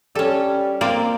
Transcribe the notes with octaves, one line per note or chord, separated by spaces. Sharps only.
G3 C#4 A4
A#3 C4 A#4 D5